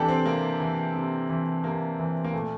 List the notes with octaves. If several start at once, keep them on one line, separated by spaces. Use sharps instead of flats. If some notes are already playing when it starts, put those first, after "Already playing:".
Already playing: C3 E3 D4 G4 A4
C4
C3 A#3
E3
C3
E3
C3 A#3
E3
A#3
A#2 A3